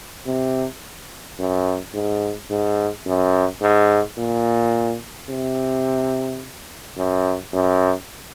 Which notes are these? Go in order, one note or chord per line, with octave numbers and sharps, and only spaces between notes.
C3
F#2
G#2
G#2
F#2
G#2
A#2
C3
F#2
F#2